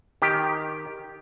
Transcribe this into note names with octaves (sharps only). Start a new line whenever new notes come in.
D#3 G4